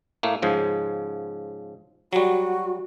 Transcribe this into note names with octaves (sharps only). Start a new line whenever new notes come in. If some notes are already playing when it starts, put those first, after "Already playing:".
A2 A3 A#3
G#2 C#3 F3
F#3 G3 F#4